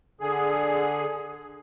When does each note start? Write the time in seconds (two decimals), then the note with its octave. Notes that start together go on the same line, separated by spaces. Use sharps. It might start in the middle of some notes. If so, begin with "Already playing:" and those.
0.21 D3 G#4